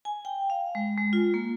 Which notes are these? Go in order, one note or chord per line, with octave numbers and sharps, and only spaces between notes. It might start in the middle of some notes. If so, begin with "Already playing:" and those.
G#5
G5
F5
G#3
G#3
F4
A#3